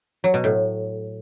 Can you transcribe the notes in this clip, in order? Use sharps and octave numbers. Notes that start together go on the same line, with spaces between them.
F#3
B2
A2